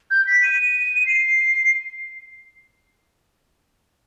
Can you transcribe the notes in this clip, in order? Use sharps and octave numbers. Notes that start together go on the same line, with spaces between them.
G6
B6
D#7
C7